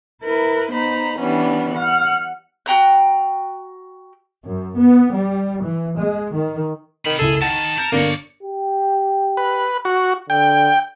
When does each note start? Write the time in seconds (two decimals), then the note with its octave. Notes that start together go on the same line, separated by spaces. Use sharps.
0.22 E4 A#4 B4
0.72 B3 D#4 C5 A#5 B5
1.20 E3 G3 B3 C#4 D4
1.75 F#5 F6
2.66 F#4 G5 A#5 F#6
4.45 F#2
4.78 B3
5.14 G3
5.63 E3
5.99 G#3
6.33 D#3
7.06 C3 D#3 B5
7.19 F#1 C#2 E4 G#4 A4
7.42 D#3 F#5 A5
7.78 A#4 G6 C#7
7.92 G1 A#3 D4 C#5 D5 A#6
8.43 G4
9.37 B4
9.85 F#4
10.30 D3 G5